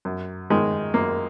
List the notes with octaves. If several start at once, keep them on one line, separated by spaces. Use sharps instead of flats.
F#2
D#3 G#3
F#2 A#3